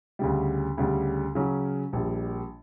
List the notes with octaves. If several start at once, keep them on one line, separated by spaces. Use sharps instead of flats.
D2 C#3 G3
D2 C#3 G3
C#3 F#3 C#4
A#1 A#2 G3